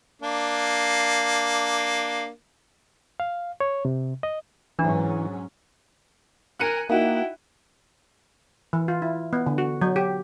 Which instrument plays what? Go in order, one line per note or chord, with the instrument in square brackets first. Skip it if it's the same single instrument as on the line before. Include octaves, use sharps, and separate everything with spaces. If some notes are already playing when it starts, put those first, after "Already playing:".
[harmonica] A#3 D4
[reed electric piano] F5
C#5
C3
D#5
[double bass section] G#2 F#3 C#4 [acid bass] E3 [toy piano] D4
[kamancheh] A#4 G#5 [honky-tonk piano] F#6 C#7 D#7
[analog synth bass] A#3 [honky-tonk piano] D#4 F#4 [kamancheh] E4 G5
[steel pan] E3
F4
E4
B3
D3
F#4
F#3
G4